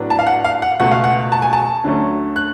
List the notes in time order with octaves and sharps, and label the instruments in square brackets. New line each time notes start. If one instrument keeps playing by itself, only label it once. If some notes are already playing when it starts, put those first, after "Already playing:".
Already playing: [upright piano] A2 F#3 B3 D4
A5
F5
F#5
F5
F#5
C#2 B2 A3 F4 F#5
F5
F#5
A5
G#5
A5
D2 D3 F#3 A3 C#4
F#6